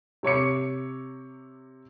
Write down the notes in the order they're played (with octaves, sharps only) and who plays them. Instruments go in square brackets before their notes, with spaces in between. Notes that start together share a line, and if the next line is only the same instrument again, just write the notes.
[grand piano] C3 C#5 D6 C#7